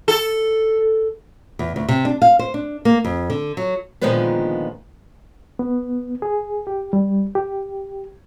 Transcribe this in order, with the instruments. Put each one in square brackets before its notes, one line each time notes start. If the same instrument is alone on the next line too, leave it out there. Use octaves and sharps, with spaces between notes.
[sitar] A4
[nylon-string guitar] E2
D2
C3
D4
F5
C5
D4
A#3
F2
D3
F#3
[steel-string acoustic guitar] A#2 D3 D#3 F3 G#3 B3
[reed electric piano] B3
G#4
G4
G3
G4